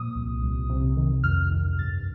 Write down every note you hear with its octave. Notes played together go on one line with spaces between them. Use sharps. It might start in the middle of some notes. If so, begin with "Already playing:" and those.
Already playing: A#2 F3 D#6
C2
C2
C3
D#3
F2 F6
D#3
G2 A6